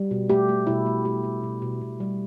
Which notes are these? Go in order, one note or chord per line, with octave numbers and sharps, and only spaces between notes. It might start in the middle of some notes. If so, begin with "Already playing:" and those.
Already playing: G3
B2
A3 G4
A3
B2 E4
A3
A3 G4
A3
B2
B2
B2
G3